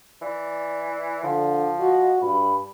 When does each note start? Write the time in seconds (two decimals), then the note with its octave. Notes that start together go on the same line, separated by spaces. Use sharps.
0.22 E3 D5
1.24 D3 F3
1.80 F#4 D#5
2.22 G2 B5